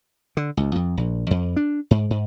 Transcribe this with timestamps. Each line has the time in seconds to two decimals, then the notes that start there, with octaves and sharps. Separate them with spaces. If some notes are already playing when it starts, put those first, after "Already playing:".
0.37 D3
0.57 C#2
0.75 F2
0.97 A#1
1.31 F2
1.56 D4
1.91 G#2
2.10 G#2